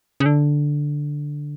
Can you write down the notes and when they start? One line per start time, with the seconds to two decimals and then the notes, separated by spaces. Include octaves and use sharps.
0.20 C#3
0.26 D3